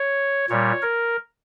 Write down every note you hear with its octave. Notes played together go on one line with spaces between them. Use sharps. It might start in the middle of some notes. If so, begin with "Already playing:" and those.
Already playing: C#5
A#2 G3 C#5
A#4